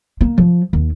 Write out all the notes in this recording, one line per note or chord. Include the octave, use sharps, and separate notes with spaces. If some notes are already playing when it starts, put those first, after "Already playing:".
A#3
F3
D#2